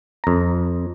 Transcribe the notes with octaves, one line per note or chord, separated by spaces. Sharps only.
F2 A#5